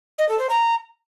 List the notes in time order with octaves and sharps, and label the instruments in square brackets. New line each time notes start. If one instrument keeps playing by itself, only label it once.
[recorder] D#5
A4
C5
A#5